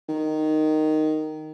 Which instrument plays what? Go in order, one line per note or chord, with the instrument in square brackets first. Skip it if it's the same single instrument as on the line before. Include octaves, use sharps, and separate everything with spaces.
[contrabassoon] D#3